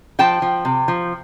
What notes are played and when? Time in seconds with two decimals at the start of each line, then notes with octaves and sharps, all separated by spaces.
0.19 F3 G5 A5
0.42 F3
0.65 C3
0.88 F3